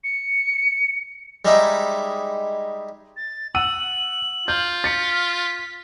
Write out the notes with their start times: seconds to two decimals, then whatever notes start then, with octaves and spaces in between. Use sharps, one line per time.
0.04 C#7
1.45 G3 G#3 D#4 E4
3.17 A6
3.55 F#5 E6 D#7 F#7
4.48 F4 G6
4.84 A6 B6 C#7